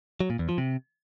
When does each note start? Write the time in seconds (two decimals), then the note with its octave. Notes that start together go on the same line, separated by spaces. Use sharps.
0.20 F#3
0.30 A#2
0.39 E2
0.49 F3
0.58 C3